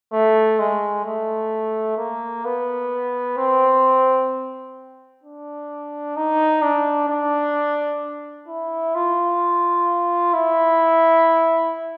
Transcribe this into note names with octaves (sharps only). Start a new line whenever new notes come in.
A3
G#3
A3
A#3
B3
C4
D4
D#4
D4
D4
E4
F4
E4